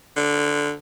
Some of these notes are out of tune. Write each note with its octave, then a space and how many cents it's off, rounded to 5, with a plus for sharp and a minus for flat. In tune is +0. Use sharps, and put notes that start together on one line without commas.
D3 -5